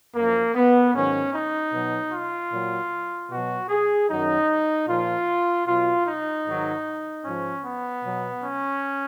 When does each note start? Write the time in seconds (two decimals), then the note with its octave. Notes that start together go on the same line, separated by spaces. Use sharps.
0.15 F#2 F3 A#3
0.55 B3
0.94 G#2 D#3 F#3 C#4
1.33 D#4
1.73 B2 F#3
2.12 F4
2.52 A#2 F#3
3.30 B2 F#3 F#4
3.69 G#4
4.09 F#2 D#3 F#3 D#4
4.88 A#2 F3 F4
5.67 B2 F#3 F4
6.06 D#4
6.46 G#2 D#3 F#3
7.25 G#2 F3 C#4
7.64 B3
8.04 B2 F#3
8.43 C#4